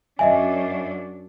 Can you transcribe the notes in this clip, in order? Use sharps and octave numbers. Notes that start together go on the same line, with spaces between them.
F#2 D4 D#5 E5 G#5